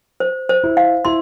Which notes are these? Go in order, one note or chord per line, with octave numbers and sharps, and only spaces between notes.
C5
C5
E4
F5
E4 C6